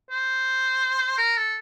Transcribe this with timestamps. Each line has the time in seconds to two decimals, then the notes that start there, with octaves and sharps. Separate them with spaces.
0.11 C5
1.18 A#4
1.37 A4